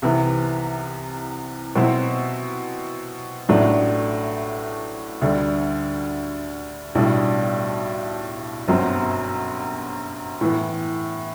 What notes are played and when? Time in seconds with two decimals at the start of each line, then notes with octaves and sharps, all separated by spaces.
0.02 C2 C3 E3 B3
1.76 B2 F#3 C4 E4
3.49 A1 A2 F#3 A3 D4
5.21 D2 D3 G3
6.95 B1 A2 G3 D4
8.68 G1 F#2 F#3 C4
10.41 A2 E3 B3